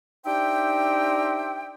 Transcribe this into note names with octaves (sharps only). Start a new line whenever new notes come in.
D4 D#4 G4 C5 E5 G5